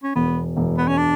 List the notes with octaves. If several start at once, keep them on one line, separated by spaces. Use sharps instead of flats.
C#4
E1 B3
E1
B3
C#4
D4